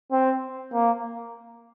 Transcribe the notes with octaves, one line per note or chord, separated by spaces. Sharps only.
C4
A#3